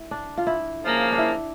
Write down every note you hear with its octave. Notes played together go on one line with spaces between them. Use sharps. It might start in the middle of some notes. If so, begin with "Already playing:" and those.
Already playing: E4
D4
F4
E4
C#3 F3 A#3
D4
E4